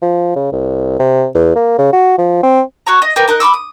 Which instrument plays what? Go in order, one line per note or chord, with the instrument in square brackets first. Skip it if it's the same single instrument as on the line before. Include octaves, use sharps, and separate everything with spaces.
[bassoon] F3
C#3
C2
C3
E2
A#3
C#3
F#4
F3
C4
[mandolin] F#4 C#5 A#5
D#5
G4 A#4 B4
D#4 A#4 D#5 F#6
B5 C6 D6 E6
D#6